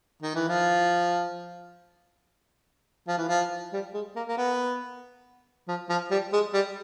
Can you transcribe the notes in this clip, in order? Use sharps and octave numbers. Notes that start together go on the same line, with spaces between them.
D#3
E3
F3
F3
E3
F3
G3
G#3
A#3
A#3
B3
F3
F3
G3
G#3
G3